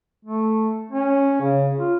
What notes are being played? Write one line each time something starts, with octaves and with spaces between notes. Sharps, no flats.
A3
C#4
C#3
F4